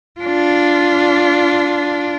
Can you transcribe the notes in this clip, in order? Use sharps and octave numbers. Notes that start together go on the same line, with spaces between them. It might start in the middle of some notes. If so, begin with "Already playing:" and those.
D4 F4